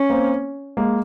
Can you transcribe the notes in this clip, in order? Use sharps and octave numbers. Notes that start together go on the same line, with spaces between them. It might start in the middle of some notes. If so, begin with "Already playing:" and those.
Already playing: C#4
A#3 C4
G#3 A#3